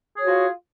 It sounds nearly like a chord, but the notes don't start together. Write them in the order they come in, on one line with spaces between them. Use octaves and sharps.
G#4 C#5 F#4 F4